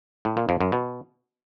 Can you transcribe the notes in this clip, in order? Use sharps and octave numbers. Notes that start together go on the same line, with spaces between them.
A2
A#2
F2
F#2
B2